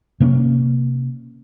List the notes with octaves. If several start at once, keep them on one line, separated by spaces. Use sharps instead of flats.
C3 A#3 C4 C#4